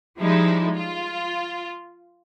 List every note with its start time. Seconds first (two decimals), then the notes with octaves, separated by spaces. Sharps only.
0.19 F3 G3 G#3 D#4 E4
0.76 F4